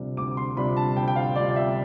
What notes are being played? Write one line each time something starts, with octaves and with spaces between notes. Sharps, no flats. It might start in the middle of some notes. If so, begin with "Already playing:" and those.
Already playing: D2 C3 G3 D4 F4
D2 D6
C6
C3 G3 D4 F4 B5
A5
D2 G5
G5
F5
C3 G3 D4 F4 D5
D5
E5